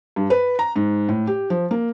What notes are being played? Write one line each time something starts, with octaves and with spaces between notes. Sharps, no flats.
G2
B4
A#5
G#2
A2
G4
F3
A#3